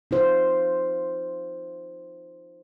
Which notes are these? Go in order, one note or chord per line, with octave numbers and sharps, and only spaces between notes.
D#4 F4 C5